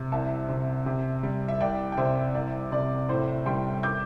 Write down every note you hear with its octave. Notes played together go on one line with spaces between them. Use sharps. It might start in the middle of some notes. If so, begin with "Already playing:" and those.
Already playing: C3
C2 E5 A5
C3
C3
G3
E5
C2 D5 G5
G5
C3 C5 E5
C2 D5
C3 D5
A2 C5
G3 G5 C6
D6 G6